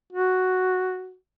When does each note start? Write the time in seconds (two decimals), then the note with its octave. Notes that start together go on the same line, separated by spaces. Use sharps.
0.13 F#4